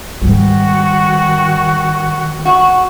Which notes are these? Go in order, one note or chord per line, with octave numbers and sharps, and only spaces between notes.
G#2 D#3 G3 F#4
F#4